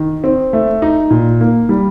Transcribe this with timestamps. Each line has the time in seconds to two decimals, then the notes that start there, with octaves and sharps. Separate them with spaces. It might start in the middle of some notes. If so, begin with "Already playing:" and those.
Already playing: D#3
0.24 C4
0.53 A3
0.82 D#4
1.10 A#2
1.41 A#3
1.69 G3